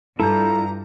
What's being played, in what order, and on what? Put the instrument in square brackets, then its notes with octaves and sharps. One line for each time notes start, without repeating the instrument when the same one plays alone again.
[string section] G2 [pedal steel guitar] E4 F4 G6 [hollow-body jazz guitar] A4 [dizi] A#5